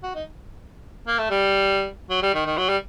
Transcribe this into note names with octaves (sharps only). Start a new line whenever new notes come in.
F#4
D#4
A#3
A3
G3
F#3
G3
D#3
D#3
F#3
G3